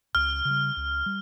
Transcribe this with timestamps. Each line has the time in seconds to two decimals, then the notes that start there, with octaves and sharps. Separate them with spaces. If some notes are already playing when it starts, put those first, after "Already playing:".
0.15 C#2 F6
0.45 C#3 G3
0.76 C#2
1.06 G3